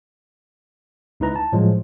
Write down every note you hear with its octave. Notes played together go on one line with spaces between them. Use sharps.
C#2 D#4 E4 B4 A#5
A5
A2 F3 F#3 G#3